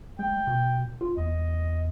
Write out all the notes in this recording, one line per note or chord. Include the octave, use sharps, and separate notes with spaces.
G#3 G5
B2
F4
E2 D#5